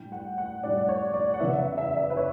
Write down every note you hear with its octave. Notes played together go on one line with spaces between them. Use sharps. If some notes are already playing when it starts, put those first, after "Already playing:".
Already playing: A2 G3 D4 G5
F#5
F#5
A2 G3 D4 D5
D5
C#5
D5
F#5
E2 C#3 E3 B3 E4 E5
E5
E5
D5
E5
B4
C#5